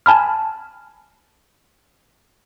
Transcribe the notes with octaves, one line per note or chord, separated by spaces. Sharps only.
G#5 A5 B5 F6